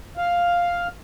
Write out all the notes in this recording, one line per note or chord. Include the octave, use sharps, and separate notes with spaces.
F5